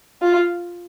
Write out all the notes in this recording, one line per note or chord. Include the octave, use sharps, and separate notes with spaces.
F4